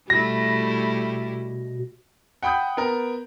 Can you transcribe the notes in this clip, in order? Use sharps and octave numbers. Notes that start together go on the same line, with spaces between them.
B2 G3 A3 E4 A#6
F#5 G5 B5 D#6 G6
B3 A#4